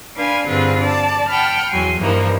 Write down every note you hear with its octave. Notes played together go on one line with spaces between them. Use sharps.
D4 B4 F5 G#5 C6
G2 D3 C4 F4 G#4 B4
D5 A5
F#5 G5 A5 B5 F6
E2 F#3 G#5 C6
G2 E3 F3 A#3 D#4